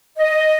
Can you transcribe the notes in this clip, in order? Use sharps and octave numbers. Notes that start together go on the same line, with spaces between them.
D#5